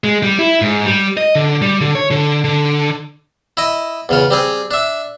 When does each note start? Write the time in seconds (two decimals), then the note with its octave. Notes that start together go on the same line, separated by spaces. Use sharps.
0.04 G#3
0.23 G3
0.39 E4
0.62 G#2
0.86 G3
1.17 D#5
1.35 D3
1.62 G3
1.81 D3
1.95 C#5
2.11 D3
2.44 D3
3.57 E4 D#5
4.09 E2 C#3 F4
4.31 G3 C4 G#4
4.71 D4 E5